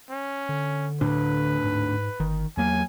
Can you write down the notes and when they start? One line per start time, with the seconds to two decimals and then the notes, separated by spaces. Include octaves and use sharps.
0.10 C#4
0.49 D3
1.01 D2 A2 D4 B4
1.64 G#2
2.20 G1 D#3
2.57 E2 F#3 A#3 G#5